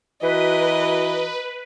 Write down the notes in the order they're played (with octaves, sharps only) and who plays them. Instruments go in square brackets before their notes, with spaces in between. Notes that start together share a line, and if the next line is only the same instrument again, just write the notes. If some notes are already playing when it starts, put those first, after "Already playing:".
[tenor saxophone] E3 [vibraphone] F#4 [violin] A#4 D#5 [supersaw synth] B4